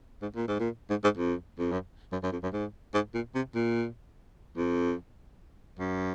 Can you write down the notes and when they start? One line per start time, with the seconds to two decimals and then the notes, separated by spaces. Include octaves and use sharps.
0.22 G#2
0.36 A#2
0.48 G#2
0.60 A#2
0.90 G#2
1.04 G#2
1.17 F2
1.59 F2
1.72 F#2
2.12 F#2
2.23 F#2
2.32 F2
2.43 F#2
2.53 G#2
2.94 G#2
3.14 A#2
3.35 C3
3.55 A#2
4.57 F2
5.79 F#2